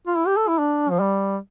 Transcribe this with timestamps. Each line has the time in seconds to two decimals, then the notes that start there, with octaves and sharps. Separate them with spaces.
0.07 F4
0.17 E4
0.27 G4
0.37 A4
0.48 E4
0.58 D4
0.90 F3
1.00 G3